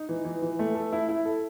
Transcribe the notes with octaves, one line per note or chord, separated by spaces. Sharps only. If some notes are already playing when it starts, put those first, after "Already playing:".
Already playing: D#4
E3
E3
E3
A3
A4
E4
E4
A4